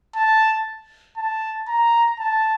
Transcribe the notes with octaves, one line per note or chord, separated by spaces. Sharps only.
A5
A5
A#5
A5